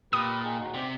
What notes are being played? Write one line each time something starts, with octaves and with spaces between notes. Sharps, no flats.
A#2 G4 B4 D#6
D#4 G#4 G5
D#2 D#4 F#4
C3 D5 G5